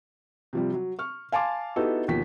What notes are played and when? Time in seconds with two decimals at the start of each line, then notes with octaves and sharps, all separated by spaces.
0.53 C3 F3 G3
0.74 F#3
0.99 C#6 F6
1.32 F5 G#5 A5 C6 D6
1.76 B3 D#4 E4 F#4 G4 A4
2.08 D#2 B2 F3 B6